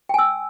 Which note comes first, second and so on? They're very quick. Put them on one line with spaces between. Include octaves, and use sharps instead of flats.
G5 G#5 E6